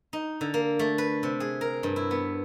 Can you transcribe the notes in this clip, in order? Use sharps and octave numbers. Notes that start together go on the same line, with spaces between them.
D#4
D3
A#3
A3
B4
C3
G#4
A#4
G2
E4
B3